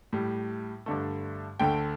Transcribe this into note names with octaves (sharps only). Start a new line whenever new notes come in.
A2 G3
G2 D3 A3
D2 D3 A3 G5